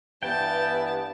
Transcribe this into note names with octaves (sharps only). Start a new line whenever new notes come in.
G2 E3 B3 G5 A5